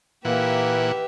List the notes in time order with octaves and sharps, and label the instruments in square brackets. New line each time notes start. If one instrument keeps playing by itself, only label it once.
[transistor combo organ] A#2 E3 F#5 [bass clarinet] A#3 [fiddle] G4 E5 [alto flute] B4